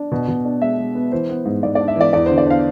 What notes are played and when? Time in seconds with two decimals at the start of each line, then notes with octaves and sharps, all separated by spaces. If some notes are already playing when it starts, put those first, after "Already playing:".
Already playing: D4
0.12 B2
0.28 B2
0.45 D4
0.62 G#3 E5
0.78 G#3
0.95 B3
1.12 E3 C5
1.29 B3
1.45 G#2
1.63 G#2 D5
1.75 D5
1.80 D4
1.88 E5
1.96 E3 D5
2.13 E2 D5
2.26 D3 C5
2.38 D5
2.46 D4 F5